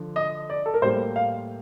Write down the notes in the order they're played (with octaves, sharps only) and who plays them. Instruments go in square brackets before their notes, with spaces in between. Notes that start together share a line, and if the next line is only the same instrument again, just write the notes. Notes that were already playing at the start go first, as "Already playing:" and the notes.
Already playing: [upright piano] D3 F3
D#5
D5
A4
A#4
A2 G3 A#3 C5
F5